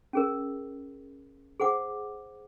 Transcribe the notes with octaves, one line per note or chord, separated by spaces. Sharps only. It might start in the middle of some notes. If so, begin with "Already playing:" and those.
C#4 G#4 A#4
G#4 C5 F#5 D6